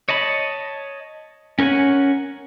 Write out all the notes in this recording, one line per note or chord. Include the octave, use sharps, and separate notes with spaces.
C#5 D#5 A5 B5
C#4 A#4 C#5 F#5 G#5